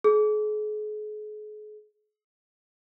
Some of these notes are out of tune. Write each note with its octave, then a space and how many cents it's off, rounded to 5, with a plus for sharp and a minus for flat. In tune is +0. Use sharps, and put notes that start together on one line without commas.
G#4 +40